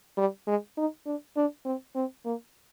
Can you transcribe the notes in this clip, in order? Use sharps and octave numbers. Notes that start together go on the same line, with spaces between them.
G3
G#3
D#4
D4
D4
C4
C4
A#3